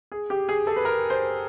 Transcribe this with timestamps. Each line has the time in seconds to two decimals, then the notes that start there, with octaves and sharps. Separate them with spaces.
0.12 G#4
0.30 G4
0.49 G#4
0.67 A4
0.76 B4
0.85 A#4
1.10 C5